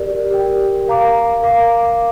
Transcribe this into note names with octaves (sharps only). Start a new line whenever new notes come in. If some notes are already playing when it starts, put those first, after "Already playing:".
Already playing: G4 A#4 D5
G4 A#4 G5
A#4 F5 A#5 D6
A#4 F5 A#5 D6